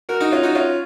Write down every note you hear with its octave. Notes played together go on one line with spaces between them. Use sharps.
F#4 A#4
D#4 F#4
C#4 F4
D#4 F#4
C#4 F4